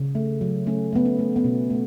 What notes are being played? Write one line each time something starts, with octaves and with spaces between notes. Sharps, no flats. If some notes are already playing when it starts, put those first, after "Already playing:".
Already playing: C#3
A3
F#3
A3 C#4
A3 B3
C#4
A3
B3
B2 C#4
A3